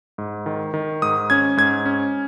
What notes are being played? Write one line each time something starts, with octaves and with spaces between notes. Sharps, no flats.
G#2
D#3
D#3
G#2 D#6
C#4 G#6
G#2 G#6
C#4